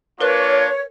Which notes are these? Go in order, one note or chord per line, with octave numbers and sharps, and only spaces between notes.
A#3 D4 F4 A#4 B4 C#5 F#6